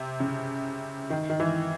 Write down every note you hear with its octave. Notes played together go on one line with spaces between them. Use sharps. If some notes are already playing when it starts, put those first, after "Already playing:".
Already playing: C3
C#3
D#3
D#3
E3